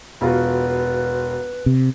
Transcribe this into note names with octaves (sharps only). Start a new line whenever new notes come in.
E1 F4 F#4 B4
C3